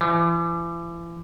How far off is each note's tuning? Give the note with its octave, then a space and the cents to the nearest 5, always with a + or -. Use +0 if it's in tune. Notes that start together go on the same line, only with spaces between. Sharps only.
E3 +40